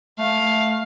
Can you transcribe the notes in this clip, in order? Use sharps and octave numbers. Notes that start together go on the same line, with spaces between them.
A3 F5